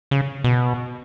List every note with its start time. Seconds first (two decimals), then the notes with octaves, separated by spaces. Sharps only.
0.11 C#3
0.44 B2